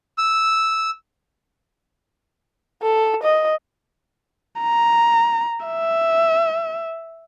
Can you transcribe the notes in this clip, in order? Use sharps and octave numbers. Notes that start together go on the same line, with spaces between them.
E6
A4
D#5
A#5
E5